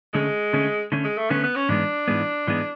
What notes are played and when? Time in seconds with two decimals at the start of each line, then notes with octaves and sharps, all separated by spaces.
0.13 D3 G#3 A3 C#4
0.53 D3 A3 C#4
0.92 D3 A3 C#4
1.04 G#3
1.18 A3
1.30 D3 A3 B3 C#4
1.44 B3
1.56 C#4
1.69 G#2 E3 G#3 B3 D4
2.08 G#2 E3 G#3 B3
2.47 G#2 E3 G#3 B3